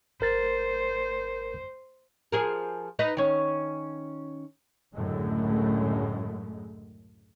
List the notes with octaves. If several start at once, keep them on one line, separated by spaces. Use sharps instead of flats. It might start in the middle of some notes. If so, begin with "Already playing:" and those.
G#1 A#4 C5 A6
F3 G#4 A#4
D#4 B4 D#5
D#3 C#4
C#2 F#2 A2 D3 G#3 A3